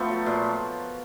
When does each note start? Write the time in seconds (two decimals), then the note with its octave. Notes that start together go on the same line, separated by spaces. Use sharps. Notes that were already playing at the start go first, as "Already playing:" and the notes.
Already playing: F3 A3 B3
0.09 F#3
0.26 A#2